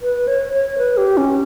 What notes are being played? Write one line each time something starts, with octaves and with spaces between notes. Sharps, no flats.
B4
C#5
C#5
B4
G4
C#4